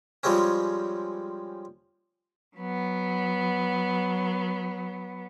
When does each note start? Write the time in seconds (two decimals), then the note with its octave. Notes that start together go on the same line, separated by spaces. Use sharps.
0.23 F3 G3 G#3 C4 C#4
2.57 F#3 B3